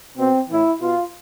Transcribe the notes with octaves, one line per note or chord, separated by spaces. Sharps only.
B2 C4
A2 E3 E4
B2 F4